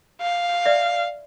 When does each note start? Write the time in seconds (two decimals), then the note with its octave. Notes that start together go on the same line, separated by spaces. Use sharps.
0.21 F5
0.66 D5 E5